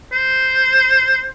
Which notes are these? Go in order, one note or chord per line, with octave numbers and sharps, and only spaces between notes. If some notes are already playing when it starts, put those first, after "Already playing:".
C5